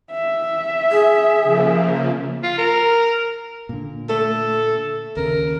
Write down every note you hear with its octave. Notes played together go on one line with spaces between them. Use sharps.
E5
G#4
C#3 F3 A#3
F4
A#4
A#2 D3
A3 A4
D#2 C#3 A#4